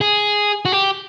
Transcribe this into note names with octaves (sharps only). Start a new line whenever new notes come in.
G#4
F#4
G4